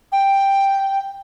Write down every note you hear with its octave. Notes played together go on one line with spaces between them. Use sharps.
G5